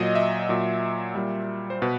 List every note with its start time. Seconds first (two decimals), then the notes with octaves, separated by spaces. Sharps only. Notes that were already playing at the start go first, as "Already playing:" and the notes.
Already playing: A#2 F#3 D#5
0.15 E5
0.49 A#2 F#3
1.15 A#2 G3
1.70 C5
1.82 B2 B4